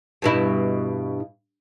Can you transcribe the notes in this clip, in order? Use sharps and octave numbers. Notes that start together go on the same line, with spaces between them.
G2 B2 E4